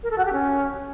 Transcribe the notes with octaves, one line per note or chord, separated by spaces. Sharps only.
A#4
A4
F#4
G4
C#4